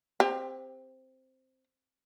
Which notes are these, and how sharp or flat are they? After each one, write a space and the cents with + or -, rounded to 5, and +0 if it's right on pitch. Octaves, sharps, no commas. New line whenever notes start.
C4 +0 G4 +25